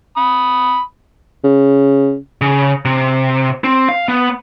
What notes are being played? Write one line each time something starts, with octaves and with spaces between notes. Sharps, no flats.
B5 D#6
C#3
C#3
C3
C4
F5
B3